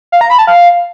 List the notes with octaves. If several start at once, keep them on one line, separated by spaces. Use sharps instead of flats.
F5
A#5
B5
A5
F5